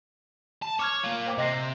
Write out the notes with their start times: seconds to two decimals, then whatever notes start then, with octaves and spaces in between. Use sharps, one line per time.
0.62 A5
0.79 C#5 D6 F6 G#6
1.04 A#3 F4
1.26 C5 G5 D6
1.38 C3 D#5 A#6 C7